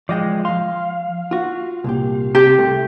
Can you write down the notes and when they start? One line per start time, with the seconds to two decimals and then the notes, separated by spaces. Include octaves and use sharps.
0.09 F3 G#3 D5 D#5 G5
0.45 F3 F5 C6
1.31 F4 F#4
1.84 C2 A#2 G4
2.35 C3 G4
2.58 C2 A3